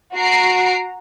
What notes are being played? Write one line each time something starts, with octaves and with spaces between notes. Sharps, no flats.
F#4 A#5 C7 D7